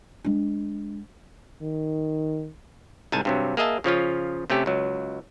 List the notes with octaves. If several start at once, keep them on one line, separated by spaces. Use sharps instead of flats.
G#3 D4
D#3
C2 G#2 G#5 A5
G2 C3 F#3
A#3 G#4 D#5 E5 A5
C#3 F3 C#4 F4
C3 A3 C#4 G4
C#2 F#3